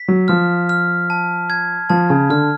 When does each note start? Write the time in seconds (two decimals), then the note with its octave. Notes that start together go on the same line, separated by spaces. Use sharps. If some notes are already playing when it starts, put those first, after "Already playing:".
Already playing: B6
0.08 F#3
0.28 F3 F6
0.69 F6
1.10 A5
1.50 G#6
1.89 F3 A5
2.10 C#3
2.30 D3 F6